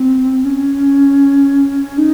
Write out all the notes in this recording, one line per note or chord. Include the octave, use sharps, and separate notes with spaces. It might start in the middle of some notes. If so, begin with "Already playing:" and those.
Already playing: C4
C#4
D#4